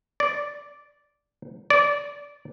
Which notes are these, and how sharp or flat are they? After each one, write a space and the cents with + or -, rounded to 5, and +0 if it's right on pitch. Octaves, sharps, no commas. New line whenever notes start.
D5 -5
D5 -15